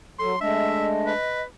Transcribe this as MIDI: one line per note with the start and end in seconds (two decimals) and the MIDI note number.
0.19 0.36 54
0.19 0.33 69
0.19 0.36 84
0.40 1.13 56
0.40 1.13 57
0.40 1.13 62
0.40 1.42 75
0.40 0.87 76
1.06 1.44 71